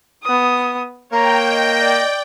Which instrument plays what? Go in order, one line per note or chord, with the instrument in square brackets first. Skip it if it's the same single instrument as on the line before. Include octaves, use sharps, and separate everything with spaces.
[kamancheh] B3 D#6
[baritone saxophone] A#3 [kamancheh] C#5 [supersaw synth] G5 [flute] A#5
[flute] D#5
[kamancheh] D5